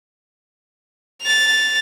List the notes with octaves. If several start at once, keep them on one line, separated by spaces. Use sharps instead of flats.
A6 F7